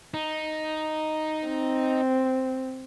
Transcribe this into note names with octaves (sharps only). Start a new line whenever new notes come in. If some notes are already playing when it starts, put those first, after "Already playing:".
D#4
C4